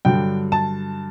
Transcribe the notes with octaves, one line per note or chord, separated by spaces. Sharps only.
G2 D3 F#3 G5
A5